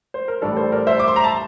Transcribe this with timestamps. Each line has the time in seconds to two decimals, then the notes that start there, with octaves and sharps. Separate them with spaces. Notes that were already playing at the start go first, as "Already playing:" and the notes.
0.14 C5
0.28 A#4
0.42 A1 A2 G3 D4 A4
0.57 A4 C5
0.72 A#4 D5
0.87 C5 E5
1.00 D6
1.08 C6
1.16 A#5
1.24 A5